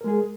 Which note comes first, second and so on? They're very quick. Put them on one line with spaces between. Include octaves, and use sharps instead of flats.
A#4 G#3 G#4